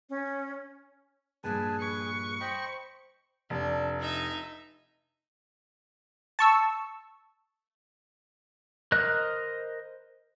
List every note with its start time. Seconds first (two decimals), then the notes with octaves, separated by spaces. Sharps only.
0.10 C#4
1.44 G2 A#2 F3 G#4 B4 G#5 A5
1.80 B4 C#6
2.41 C5 D#5 G5 B5
3.50 F1 D4
4.00 D#4 E5
6.39 A5 C#6 E6
8.92 A#4 C5 D#5 F#6